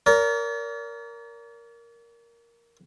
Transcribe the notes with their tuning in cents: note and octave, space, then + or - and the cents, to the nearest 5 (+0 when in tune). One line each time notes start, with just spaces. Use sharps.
A#4 +0 D5 -40